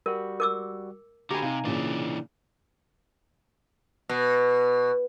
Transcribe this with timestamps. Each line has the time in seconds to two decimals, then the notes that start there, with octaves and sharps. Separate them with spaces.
0.06 G3 F#4 A#4
0.40 A#4 D6 E6
1.30 D3 F#4 G4 G#5 A#5 B5 D6
1.42 C3 D#4 F5
1.65 A#2 C#3 E3 D4 D5
4.09 B2